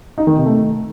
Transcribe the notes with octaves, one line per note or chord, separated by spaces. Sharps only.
D#4
D#3
C3
A3